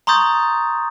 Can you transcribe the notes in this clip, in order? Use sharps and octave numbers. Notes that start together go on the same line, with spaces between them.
A#5 C6 C#6 D#6 G6 A6